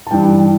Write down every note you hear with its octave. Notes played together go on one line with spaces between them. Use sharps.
A5
G2 E3 G3 G5